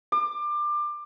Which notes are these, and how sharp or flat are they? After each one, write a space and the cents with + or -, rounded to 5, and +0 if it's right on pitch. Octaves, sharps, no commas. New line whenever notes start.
D6 +25